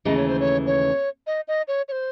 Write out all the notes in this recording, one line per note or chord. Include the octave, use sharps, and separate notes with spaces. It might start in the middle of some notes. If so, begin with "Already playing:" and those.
D#2 C#3 E3 A3 D#5
C#5
C5
C#5
C#5
D#5
D#5
C#5
C#5
C5